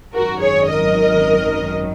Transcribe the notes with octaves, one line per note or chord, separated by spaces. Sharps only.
G#1 F#2 D#3 F#3 F#4 A#4
G#4 C#5
A#4 D#5